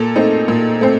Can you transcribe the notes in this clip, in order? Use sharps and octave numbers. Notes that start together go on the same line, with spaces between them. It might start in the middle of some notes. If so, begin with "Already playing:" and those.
Already playing: A#2 A4
A3 C4 D#4
A#2
A3 C4